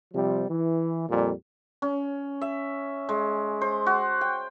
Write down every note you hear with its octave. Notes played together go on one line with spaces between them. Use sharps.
C3 F3 G3
E3
F2 A#2 G3
C#4
E5
G#3
C5
F#4
G5